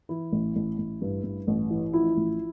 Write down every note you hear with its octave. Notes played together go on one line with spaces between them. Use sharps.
E3 E4
A1
A1
A1
G2
G2
A1
E3
F3 E4
A1